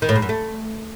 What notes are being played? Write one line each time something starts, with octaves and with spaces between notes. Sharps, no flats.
D#3
A2
G#2
F#2
A3